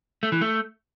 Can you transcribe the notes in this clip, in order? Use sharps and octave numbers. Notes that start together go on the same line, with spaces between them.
A3
E3
A3